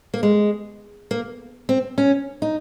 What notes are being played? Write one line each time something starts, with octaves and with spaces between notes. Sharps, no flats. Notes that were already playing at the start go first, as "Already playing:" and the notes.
A#3
G#3
A#3
C4
C#4
D#4